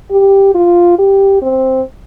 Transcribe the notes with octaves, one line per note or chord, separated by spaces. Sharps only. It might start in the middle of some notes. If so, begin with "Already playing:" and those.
G4
F4
G4
C4